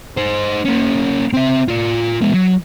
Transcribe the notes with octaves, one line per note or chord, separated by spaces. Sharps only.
D#4 C5
A#3 C#4
C4 E5
F4 D5
G#3 B3
F#3